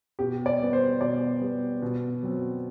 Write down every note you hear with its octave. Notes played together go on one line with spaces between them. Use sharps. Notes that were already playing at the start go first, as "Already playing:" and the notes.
B2 G4
D5
G3 B3
C5
B2 D5
G3 B3
B2
F#3 C4